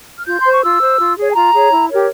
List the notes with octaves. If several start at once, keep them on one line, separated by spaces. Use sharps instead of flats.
F6
F4 G6
C5 C6
C#6
F4 E6
C5
F4
G#4 C#5
G#5
F4 A#5
G#4 C#5
E4
G4 A#4 C#5